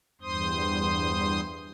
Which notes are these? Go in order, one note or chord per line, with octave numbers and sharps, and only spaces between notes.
E2 G2 C5 C6 D#6